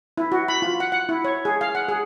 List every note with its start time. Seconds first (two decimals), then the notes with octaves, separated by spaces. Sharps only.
0.18 E4
0.32 F#4
0.48 B5
0.62 F4
0.80 F#5
0.92 F#5
1.09 E4
1.25 C#5
1.45 G#4
1.61 F5
1.75 F#5
1.89 G#4